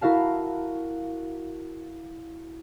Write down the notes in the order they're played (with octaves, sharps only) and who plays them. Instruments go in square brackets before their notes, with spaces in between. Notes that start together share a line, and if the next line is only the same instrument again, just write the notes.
[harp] E4 F#4 A#4 F5 A5